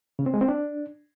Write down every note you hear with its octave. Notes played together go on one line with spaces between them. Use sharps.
C#3
C4
G#3
C4
D4